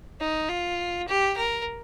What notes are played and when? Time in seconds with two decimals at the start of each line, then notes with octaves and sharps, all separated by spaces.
0.20 D#4
0.49 F4
1.08 G4
1.37 A#4